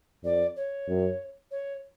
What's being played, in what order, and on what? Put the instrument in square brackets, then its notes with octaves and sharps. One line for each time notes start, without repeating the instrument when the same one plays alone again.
[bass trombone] F2 [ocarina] D5
[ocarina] C#5
[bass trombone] F#2
[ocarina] C#5